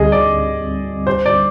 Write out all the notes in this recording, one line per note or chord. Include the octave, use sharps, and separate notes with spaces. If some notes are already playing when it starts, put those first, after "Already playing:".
Already playing: D2 D3 G3 C4 G#4 D#5
D5
C5
D5